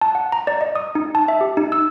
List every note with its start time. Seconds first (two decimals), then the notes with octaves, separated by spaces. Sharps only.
0.01 A5
0.15 F#5
0.32 A#5
0.47 D5
0.61 D#5
0.75 D#6
0.95 D#4
1.15 A5
1.28 E5
1.41 G4
1.57 D#4
1.72 E6